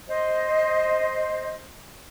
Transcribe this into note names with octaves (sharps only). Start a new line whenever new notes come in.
C5 D#5